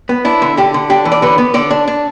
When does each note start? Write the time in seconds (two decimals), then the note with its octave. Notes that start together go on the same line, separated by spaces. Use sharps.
0.09 B3
0.25 D4 E4
0.42 D3
0.57 D3 G4
0.74 D3
0.90 D4 G4
1.05 E3
1.12 D5
1.22 D3 B4
1.38 B3
1.54 D3 D5
1.71 D4
1.88 D4